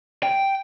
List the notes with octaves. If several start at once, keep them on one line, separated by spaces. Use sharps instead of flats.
G5